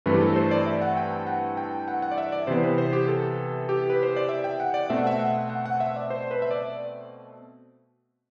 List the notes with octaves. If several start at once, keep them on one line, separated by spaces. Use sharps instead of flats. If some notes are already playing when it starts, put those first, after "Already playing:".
G2 E3 A3 C4 B4
G4
A4
C5
D5
E5
F#5
G5
G5
F#5
G5
F#5
F#5
D5
E5
D5
C3 E3 B3 C5
B4
C5
G4
A4
G4
B4
C5
D5
E5
G5
F#5
D5
B2 A3 C4 E5
F#5
E5
F#5
F#5
F#5
E5
D5
C5
B4
E5
D5